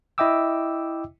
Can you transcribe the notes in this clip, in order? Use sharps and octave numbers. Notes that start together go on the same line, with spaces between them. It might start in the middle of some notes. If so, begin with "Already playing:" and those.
E4 D#5 E5 G5 D6 E6